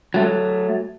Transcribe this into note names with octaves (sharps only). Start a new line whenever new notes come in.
F#3 A3